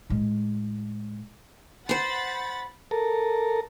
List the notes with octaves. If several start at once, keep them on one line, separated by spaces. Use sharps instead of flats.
A2 G#3
C5 F#5 B5 C6 A6
A4 A#4